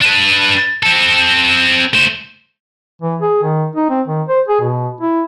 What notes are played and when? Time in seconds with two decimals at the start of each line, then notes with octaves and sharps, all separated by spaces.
0.01 D4 B4
0.83 C4 A4
1.94 A3 C5
3.02 E3
3.22 G#4
3.43 D#3
3.76 D#4
3.90 C4
4.07 D#3
4.28 C5
4.48 G#4
4.61 B2
5.01 E4